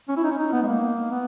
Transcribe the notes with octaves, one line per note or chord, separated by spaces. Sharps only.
C#4
E4
D#4
C#4
D#4
B3
G#3
A#3
B3